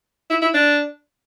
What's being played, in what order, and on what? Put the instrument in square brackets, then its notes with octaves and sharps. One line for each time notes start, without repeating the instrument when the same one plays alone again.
[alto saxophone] E4
E4
D4